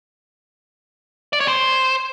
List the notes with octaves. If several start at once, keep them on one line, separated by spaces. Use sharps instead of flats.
D5
C#5
C5